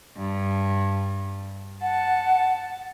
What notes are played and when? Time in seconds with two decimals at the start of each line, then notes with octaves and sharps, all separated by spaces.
0.17 G2
1.82 F#5 A5